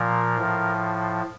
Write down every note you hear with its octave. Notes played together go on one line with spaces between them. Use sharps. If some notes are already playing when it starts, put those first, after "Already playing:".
Already playing: A#2 F3 A#4
A2 F3